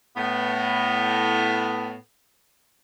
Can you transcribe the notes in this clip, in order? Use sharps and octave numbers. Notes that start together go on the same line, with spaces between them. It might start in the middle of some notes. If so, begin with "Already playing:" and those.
A2 B3